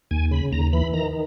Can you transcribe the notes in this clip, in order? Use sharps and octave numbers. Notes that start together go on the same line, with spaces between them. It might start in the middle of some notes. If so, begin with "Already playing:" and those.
D#2 G#5
C#3 B5
D#2 A#5
E3 B5
D#3 A#5